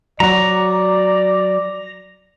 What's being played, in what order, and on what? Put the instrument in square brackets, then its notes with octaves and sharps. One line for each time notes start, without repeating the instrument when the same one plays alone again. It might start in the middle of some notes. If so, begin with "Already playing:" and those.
[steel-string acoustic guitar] F#3 F#4 [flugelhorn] D5 [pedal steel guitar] A#5